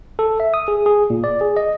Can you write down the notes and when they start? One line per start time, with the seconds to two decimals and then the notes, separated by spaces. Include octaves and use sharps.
0.19 A4
0.40 E5
0.54 D#6
0.68 G#4
0.86 G#4
1.10 A#2
1.24 D5
1.41 G#4
1.57 D#5